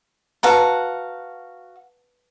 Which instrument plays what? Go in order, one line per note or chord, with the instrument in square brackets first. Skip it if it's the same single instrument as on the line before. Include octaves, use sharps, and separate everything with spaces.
[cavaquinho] F#4 F5 F#5 [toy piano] B4 A5 A#5